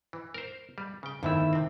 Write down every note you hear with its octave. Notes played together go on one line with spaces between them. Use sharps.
E3
A#4 C5
G3
C#3 G5
G1 F2 D3 D#3 A3 E4 E6
C3 C4